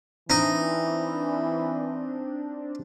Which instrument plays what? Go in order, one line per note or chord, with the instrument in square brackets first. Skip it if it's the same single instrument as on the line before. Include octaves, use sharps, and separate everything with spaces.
[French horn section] E3 [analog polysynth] C4 D4 [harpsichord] D#4